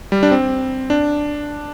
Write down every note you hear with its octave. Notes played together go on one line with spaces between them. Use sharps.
G3
D4
C4
D4